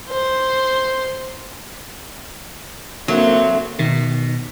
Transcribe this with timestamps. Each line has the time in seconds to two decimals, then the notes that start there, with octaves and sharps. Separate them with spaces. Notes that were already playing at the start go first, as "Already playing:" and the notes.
0.10 C5
3.08 D3 F#3 A#3 C4 E5
3.79 B2 D#3